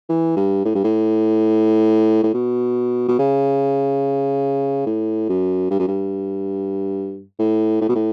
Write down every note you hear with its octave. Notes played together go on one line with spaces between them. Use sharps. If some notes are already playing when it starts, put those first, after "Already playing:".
E3
G2
A2
G2
A2
A2
B2
B2
C#3
A2
F#2
G2
F#2
G2
A2
A2
B2
A2